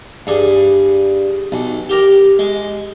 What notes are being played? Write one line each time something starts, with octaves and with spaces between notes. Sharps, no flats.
G2 G#4
B1
G4 A#4
G#3